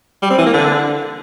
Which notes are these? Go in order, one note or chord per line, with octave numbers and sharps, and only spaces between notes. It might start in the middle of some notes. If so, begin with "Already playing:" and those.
G3
C4
E3
A#3
D3